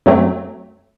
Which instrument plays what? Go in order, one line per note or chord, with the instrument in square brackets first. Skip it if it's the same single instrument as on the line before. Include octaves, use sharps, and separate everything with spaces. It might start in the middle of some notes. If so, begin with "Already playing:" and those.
[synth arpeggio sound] F#2 F#3 A3 C4